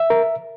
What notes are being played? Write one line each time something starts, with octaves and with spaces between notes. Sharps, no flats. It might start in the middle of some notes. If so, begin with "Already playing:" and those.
Already playing: E5
A#4